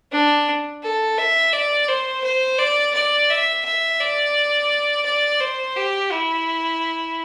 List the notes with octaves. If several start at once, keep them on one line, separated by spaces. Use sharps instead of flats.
D4
A4
E5
D5
C5
C5
D5
D5
E5
E5
D5
D5
C5
G4
E4